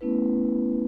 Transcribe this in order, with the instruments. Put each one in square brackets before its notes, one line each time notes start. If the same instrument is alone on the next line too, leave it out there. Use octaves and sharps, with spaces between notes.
[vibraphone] A3 B3 C#4 E4 B4